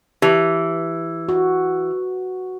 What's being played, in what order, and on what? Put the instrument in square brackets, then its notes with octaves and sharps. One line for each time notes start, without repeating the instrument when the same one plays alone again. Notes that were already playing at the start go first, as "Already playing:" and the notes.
[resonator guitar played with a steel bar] E3 [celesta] G4 A5 F7
[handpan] F#4